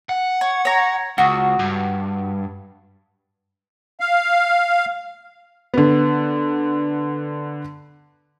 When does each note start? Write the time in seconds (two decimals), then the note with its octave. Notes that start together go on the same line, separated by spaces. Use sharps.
0.09 F#5
0.41 C#5
0.65 C#5 A#5
1.18 C#2 F#4
1.59 G2
4.00 F5
5.74 D3 B3